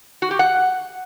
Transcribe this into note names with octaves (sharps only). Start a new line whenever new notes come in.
F#4
G4
F#5